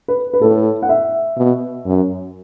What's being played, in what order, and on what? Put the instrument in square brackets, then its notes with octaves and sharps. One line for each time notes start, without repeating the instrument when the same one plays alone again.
[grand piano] B4
B4
[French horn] A2 [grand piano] A4
[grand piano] F#5
E5
[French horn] B2
F#2